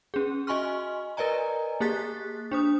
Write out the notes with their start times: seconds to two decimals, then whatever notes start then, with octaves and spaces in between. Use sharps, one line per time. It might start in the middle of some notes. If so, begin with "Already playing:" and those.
0.14 C#4 G#4
0.47 F#4 D#5 G#5 C6 C#6 F6
1.17 A#4 B4 D5 D#5 G#5 A#5
1.80 A#3 G4 G#4 F#6 A6 B6
2.52 D4 C5 D#6